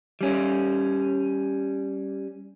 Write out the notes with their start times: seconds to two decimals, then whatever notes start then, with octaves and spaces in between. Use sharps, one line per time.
0.21 G3 C#4